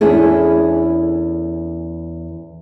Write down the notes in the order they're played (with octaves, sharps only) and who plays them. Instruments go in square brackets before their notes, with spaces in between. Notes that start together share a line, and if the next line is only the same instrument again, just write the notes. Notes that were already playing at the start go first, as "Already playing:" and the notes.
[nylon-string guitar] E2 C#4 D4 E4 G#4 A4